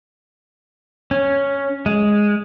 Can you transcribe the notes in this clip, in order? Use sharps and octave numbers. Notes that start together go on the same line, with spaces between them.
C#4
G#3